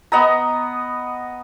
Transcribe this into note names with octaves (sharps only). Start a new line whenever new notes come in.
B3 D#5 A#5